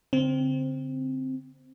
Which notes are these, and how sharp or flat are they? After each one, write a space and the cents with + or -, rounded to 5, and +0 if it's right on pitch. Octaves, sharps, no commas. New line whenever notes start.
D3 -45 C4 +0